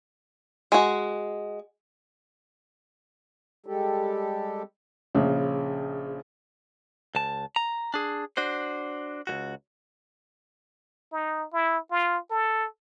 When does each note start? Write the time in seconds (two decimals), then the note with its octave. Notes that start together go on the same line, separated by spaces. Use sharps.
0.72 G#3 F#4
3.66 G3 G#3 G4 A4
5.15 A#1 C#3
7.15 C#2 A5
7.56 A#5
7.94 D4 G#4
8.37 D4 F#4 C5
9.27 C#2 F#2 F#4
11.12 D#4
11.53 E4
11.91 F4
12.31 A4